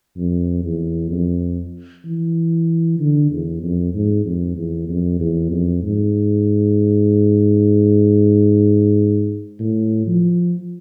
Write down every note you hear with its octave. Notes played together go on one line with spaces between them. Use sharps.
F2
E2
F2
E3
D3
E2
F2
G#2
F2
E2
F2
E2
F2
G#2
A2
F3